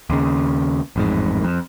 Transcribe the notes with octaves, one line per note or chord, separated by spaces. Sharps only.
D#2 C#3
A1 F2 G#2
F2